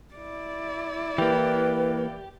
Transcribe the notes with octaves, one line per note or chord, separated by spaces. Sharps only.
E4 D5
E3 A#3 G4 B4